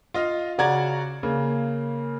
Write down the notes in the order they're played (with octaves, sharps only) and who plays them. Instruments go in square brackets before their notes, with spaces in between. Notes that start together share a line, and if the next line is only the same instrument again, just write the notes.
[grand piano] F4 D#5 F5
C#3 F#4 D5 F#5 A#5 G#6
C#3 A#3